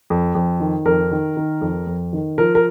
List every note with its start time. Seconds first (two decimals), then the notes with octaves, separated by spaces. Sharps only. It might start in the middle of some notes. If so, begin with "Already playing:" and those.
0.10 F2
0.35 F2
0.60 D#3
0.85 F2 A#4
1.11 D#3
1.37 D#3
1.61 F2
1.87 F2
2.13 D#3
2.38 F3 A#4
2.55 A#4